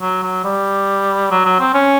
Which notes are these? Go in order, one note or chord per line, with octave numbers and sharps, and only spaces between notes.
F#3
F#3
G3
F#3
F#3
C4
C#4